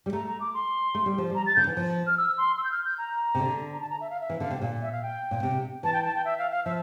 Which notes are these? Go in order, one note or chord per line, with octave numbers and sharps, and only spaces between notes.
G3
A3 A#5
A#5
D6
C6
A3
G3
F3
G3
A#5
A6
D3 G6
E3
F3
F6
E6
C6
E6
G6
F6
G6
A#5
C3
D3
A#5
A5
A#5
E5
F5
E5
E3
D3 F5
C3
A#2 F5
E5
F5
G5
A#2
C3
E3 A5
G5
A5
G5
E5
F5
F5
F3 E5